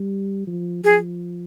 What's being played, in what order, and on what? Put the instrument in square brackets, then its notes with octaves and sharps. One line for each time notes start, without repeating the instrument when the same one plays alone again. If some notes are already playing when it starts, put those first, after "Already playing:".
Already playing: [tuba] G3
F3
[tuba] F3 [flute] G#4